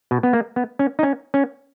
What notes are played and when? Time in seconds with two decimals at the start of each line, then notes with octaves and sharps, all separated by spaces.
0.11 B2
0.23 B3
0.33 A#3
0.56 B3
0.79 C#4
0.99 D#4
1.03 C#4
1.34 C#4